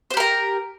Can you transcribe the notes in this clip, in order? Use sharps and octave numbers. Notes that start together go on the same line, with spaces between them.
G4 A#4 C5 A#5